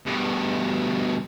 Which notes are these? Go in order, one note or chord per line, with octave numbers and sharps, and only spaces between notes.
G2 B2